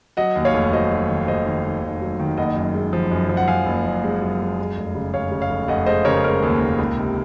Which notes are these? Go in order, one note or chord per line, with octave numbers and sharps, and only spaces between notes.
F#3 D#5 F#5
D#2
C#5 F5
F1
F#3 C5 D#5
F#3
D#3
D#2 C5 D#5
D#3
D#3
F1
F#3
D#3
F#1 D#5 F#5
F#2
G#3
F3
F#2
F3
F#5
F3 F5 G#5
F#1
F#1
G#3
F#2
G#3
G#3
F1
C#3
F1 C#5 F5
C#3
C#5 F5
F1
F1 D#5 F#5
G#3 C5 D#5
C#3 A#4 C#5
G#3 A#4
D#2
D#2
C#2
C3